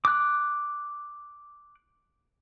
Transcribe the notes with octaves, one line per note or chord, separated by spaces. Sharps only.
D6 F#6